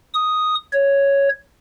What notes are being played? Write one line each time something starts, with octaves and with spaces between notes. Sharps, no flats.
D#6
C#5